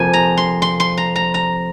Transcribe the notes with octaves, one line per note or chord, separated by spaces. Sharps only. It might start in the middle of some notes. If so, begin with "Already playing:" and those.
Already playing: F2 C3 F3 A#3 G#5
A#5
C6
C6
C6
A#5
A#5
A#5